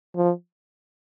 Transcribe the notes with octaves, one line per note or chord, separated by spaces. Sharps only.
F3